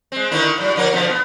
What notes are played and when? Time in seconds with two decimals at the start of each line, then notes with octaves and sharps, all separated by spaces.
0.12 G#3 C4
0.31 D3 D#3 E4
0.58 A2 F#3
0.76 D3 F3 A#4
0.93 B2 D3 F3
1.10 B3